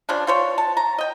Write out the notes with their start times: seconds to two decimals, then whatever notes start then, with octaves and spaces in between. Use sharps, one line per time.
0.09 C#3 F3 D4
0.27 F4 C5 C#5
0.58 A5
0.77 A#5
0.98 D#5 G5